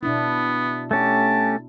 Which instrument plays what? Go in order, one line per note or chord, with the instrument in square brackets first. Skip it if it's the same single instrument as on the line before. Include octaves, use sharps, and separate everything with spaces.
[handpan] B2 D4 E4 [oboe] B3
[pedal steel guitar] A3 C#4 G4 [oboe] A5